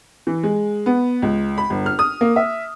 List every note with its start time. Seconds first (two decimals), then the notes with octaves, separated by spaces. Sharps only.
0.27 E3
0.43 G#3
0.86 B3
1.22 C#2
1.58 B5
1.70 G1
1.86 F6
1.99 D#6
2.21 A#3
2.36 E5